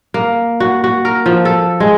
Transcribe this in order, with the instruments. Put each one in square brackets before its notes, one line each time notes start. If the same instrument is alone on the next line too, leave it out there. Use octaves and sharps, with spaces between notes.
[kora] A#3
F#4
F#4
A#4
F3
A4
G#3